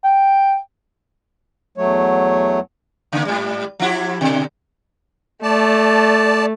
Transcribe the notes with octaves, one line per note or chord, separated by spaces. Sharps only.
G5
E2 F#3 A3 C#5
C#3 A#3
G#2 G3
F3 E4 G4
B2 D3
A3 D5 A5